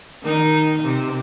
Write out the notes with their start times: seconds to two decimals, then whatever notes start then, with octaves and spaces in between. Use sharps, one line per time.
0.23 D#3 D#4
0.83 C3